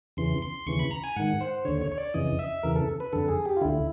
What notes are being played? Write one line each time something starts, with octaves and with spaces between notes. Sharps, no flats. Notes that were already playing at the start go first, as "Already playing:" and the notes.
E2 C#3 E3 C6
C6
D#2 C#3 E3 C#6
B5
A#5
G#5
G#2 D#3 F#5
C5
D#2 D3 C#5
C#5
C#5
D5
F2 C#3 E3 D#5
E5
E2 C#3 E3 A#4
A4
B4
F2 D3 A4
G#4
G4
F4
D2 D3 E4